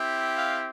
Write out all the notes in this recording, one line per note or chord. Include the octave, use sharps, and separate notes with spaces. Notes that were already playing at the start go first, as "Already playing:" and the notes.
Already playing: C4 E4 G4
F5